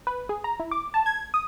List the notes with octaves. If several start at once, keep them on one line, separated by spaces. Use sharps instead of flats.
B4
G#4
A#5
E4
D6
A5
G#6
D#6